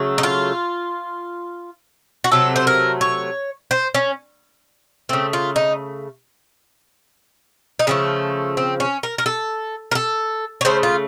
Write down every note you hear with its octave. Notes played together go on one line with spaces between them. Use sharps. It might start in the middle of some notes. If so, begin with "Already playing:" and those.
Already playing: C#3 F#3 A3
D#4
F4
F#4
C3 F#3 A3 A4
C5
A#4
C#5
C5
C#4
C#3 A3 C4
F4
D#4
D#4
C#3 F3 A3 C#4
C4
C#4
A#4
A#4
A4
A#4
A4
C#5
C#3 A3 C5
F4